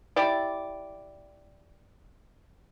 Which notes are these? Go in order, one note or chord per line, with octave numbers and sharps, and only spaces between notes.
E4 G4 D5